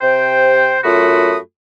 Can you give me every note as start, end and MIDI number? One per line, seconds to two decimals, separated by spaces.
0.01 0.78 48
0.01 0.78 72
0.01 0.78 79
0.84 1.36 42
0.84 1.36 57
0.84 1.36 65
0.84 1.36 66
0.84 1.36 83
0.84 1.36 87